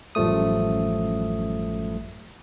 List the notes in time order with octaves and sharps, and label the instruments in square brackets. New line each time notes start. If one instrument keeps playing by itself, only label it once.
[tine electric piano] A1 F#2 F3 G3 A3 D#6